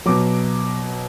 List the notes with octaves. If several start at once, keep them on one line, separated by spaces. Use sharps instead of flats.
B2 F#3 D6